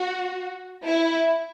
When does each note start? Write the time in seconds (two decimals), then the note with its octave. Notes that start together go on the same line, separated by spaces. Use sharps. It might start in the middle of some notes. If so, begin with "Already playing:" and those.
Already playing: F#4
0.84 E4